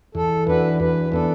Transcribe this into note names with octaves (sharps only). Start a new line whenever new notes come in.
E2 A4
E3 D4 F#4 B4
E2 B4
E3 B3 D4 A4